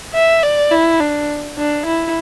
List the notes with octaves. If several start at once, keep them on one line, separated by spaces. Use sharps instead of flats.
E5
D5
E4
D4
D4
E4